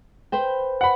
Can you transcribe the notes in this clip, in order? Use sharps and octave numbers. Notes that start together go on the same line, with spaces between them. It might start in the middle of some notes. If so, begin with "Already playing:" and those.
B4 C5 G5
F#5 B5